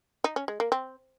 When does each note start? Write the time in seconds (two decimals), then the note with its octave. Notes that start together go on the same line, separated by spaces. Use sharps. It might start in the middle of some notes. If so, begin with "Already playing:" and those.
0.24 D#4
0.36 C#4
0.48 G#3
0.60 A#3
0.72 C4